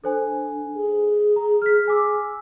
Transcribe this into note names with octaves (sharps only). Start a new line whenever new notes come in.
D4 A4 C5 G#5
G#4
A#5
F6 B6
G#5 D6 E6